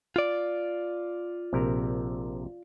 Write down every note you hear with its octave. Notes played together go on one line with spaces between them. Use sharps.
F4 D5
A#1 C3 A#4